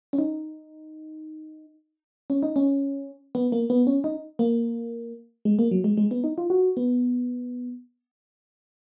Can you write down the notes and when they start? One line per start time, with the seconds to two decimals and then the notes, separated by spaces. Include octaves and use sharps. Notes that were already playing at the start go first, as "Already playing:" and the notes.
0.13 C#4
0.18 D#4
2.30 C#4
2.43 D#4
2.56 C#4
3.35 B3
3.52 A#3
3.70 B3
3.87 C#4
4.04 D#4
4.39 A#3
5.45 G#3
5.59 A#3
5.71 F#3
5.84 G#3
5.97 G#3
6.11 B3
6.24 D#4
6.38 F4
6.50 F#4
6.77 B3